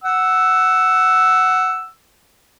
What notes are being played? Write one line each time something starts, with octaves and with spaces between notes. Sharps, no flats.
F#5 E6